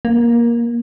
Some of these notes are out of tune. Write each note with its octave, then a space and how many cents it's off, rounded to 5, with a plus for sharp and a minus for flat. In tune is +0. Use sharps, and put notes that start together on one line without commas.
A#3 +15